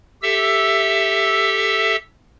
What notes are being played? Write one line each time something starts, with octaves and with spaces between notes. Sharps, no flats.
G4 A4 E5 E6